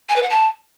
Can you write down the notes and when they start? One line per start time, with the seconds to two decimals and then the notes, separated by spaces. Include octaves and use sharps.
0.09 G#5
0.16 B4
0.23 F#5
0.30 A5